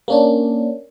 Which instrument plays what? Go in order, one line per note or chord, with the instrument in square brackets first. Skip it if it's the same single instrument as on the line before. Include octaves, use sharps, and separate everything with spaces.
[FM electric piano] A#3 C#4 D4